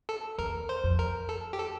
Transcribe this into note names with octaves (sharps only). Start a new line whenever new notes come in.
A4
E2 A#4
C5
F2
A#4
A4
G4
A4